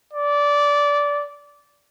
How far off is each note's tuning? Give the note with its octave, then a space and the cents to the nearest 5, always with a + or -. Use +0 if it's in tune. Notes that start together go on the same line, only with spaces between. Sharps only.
D5 -15